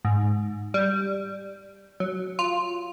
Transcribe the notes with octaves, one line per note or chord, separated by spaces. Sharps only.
G#2
G3
F#3
F4